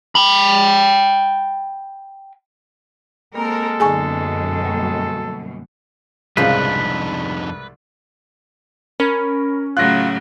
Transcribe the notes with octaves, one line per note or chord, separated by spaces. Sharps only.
G5 B5
G#3 A#3 C4 A4 A#4
F#2 B2 D3 D#4 G#4 G#5 C#6
F#3 G3 A#3
C2 F2 G#2 C#3 F3 D4 D#4 B4
C#4 A#4 B5
A2 C#3 F#3 F4 F#6 A#6